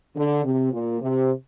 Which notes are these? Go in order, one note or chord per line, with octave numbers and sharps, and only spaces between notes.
D3
C3
A#2
C3